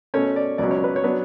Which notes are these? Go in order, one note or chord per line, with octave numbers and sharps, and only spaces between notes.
B2 A3 C#4 C#5
D5
C#2 B2 F#3 C#4 D5
C#5
B4
C#5
F#3 B3 D4